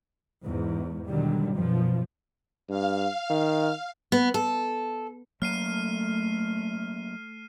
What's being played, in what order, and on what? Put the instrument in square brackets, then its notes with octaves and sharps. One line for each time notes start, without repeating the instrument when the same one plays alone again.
[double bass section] E2 G#2
B2 D3 D#3 F#3 G3
F#2 B2 F3
[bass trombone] G2 [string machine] F5
[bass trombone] D#3
[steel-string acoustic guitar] B3
A4
[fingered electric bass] F#3 A#3 [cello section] A3 [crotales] F6 C7 D#7